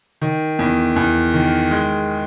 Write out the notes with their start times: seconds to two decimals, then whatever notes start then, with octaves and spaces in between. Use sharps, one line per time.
0.21 D#3
0.59 E2
0.96 E2
1.34 D#3
1.71 G#3